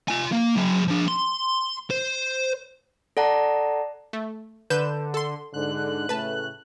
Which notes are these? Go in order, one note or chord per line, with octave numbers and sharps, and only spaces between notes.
F4 G#5
A#3
F#3 G#4
F3 D4
C6
C5
A4 D5 F#5 A5 A#5
A3
D3 B4 G6 E7
A4 C6
G#2 D3 F#6
A2 C#3 A3 B4 A5